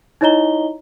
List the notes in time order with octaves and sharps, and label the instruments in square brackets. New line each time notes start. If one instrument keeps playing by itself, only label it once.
[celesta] D#4 E4 C#5 D#5 A#5 G7